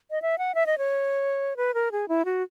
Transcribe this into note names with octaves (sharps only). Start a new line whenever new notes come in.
D#5
E5
F#5
E5
D#5
C#5
B4
A#4
G#4
E4
F#4